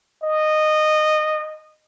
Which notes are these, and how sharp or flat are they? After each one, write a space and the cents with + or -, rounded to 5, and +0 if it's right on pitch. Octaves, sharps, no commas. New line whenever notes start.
D#5 -15